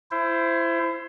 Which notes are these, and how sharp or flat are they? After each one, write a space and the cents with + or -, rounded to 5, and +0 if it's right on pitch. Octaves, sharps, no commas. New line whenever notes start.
E4 +25 C5 +0